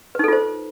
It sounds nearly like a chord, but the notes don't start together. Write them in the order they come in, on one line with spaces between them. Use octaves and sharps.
B4 D#4 A4 F4 C5